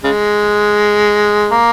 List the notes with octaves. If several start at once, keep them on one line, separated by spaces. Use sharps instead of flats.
C#3 G#3
A#3